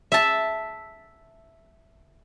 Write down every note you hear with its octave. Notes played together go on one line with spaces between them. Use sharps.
E5 A5